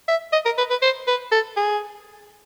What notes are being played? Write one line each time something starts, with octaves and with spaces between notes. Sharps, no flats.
E5
D#5
A#4
B4
B4
C5
B4
A4
G#4